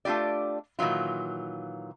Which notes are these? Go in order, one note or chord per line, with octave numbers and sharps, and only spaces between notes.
A3 D4 F4 G4 D5
A#2 D#3 E3 F#3 F4